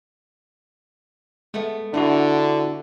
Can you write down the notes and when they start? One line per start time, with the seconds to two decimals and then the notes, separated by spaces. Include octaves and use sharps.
1.54 G#3 A3 B3
1.94 D3 A3 D4 E4 F#4